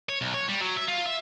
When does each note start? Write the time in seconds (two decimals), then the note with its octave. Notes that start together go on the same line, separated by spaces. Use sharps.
0.09 C#5
0.21 B1
0.34 C#5
0.48 G3
0.61 F#3
0.77 E5
0.88 F4
1.06 E5